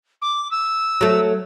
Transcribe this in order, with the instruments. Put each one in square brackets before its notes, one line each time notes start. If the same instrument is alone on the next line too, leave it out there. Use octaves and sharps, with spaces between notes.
[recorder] D6
E6
[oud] F#3 A3